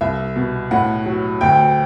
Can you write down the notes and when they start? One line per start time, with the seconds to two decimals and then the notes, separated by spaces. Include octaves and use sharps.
0.01 C2 E5
0.36 B2
0.71 A2 F#5
1.06 F#3
1.41 D2 G5